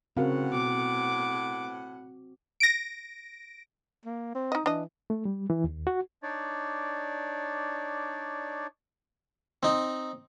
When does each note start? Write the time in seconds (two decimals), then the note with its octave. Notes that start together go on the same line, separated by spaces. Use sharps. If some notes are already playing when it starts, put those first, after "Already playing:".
0.17 A2 C#3 C4 F#4 A#4 F5 F#5
0.52 B2 D6
2.60 A#6 D7
4.05 A#3
4.35 C4
4.52 D#4 D#5
4.66 E3 D4 D#5
5.10 A3
5.25 G3
5.50 E3
5.64 D#2
5.87 F#4
6.23 D4 D#4 C#5 D5
9.63 C4 D#4